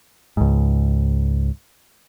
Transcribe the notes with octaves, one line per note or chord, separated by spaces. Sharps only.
C#2 G#2